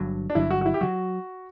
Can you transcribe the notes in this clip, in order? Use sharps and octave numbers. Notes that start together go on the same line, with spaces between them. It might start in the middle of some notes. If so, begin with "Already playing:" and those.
Already playing: G1 G2 D3 F#3
D4
G1 G2 D3 F#3 E4
F#4
F#4
E4
G4
D3 F#3 F#4